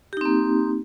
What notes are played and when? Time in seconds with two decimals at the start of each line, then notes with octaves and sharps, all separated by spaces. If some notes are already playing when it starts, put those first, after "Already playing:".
0.13 G4
0.17 D#4
0.21 C4
0.25 A#3